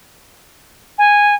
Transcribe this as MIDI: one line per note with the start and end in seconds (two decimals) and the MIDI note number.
0.98 1.35 80